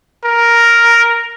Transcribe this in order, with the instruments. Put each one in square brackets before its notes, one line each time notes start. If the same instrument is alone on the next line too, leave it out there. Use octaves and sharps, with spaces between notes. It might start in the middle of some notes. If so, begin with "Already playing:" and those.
[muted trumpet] A#4